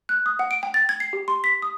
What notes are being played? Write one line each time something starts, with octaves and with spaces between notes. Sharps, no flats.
F#6
D#6
F#5
D7
G5
A6
G#6
C7
G4
C6
B6
D#6